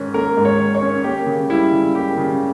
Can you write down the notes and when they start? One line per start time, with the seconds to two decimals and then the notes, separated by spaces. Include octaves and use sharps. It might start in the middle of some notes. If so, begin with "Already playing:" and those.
Already playing: G#2 D#3 C#4
0.14 A#3 A#4
0.37 G#2
0.45 C#5
0.59 D#3
0.75 C#5
0.82 C#4
1.04 A#3 G4
1.27 C#3
1.50 G3 E4
1.72 C#3
1.95 A#3 G4
2.17 C#3